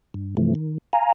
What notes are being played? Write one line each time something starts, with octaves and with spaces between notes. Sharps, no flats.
G2
G2 C3 E3 F3 A3
D#3
F5 G#5 A#5